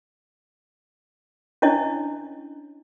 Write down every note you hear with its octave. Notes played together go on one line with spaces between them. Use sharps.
C#4 D4 E4 C#5 D#5